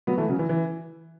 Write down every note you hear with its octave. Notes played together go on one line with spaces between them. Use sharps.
F#3 B3
E3 A3
C#3 F#3
E3
E3